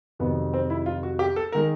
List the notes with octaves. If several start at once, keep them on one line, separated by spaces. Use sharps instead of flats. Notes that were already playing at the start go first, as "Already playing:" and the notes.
F2 C3 D#3 F#3 B3
C4
E4
F4
F#4
G4
A4
D#3 G#3 A#4